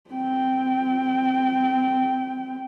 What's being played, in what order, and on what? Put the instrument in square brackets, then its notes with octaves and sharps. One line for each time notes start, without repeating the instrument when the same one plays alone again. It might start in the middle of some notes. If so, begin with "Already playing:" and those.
[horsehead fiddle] C4 G5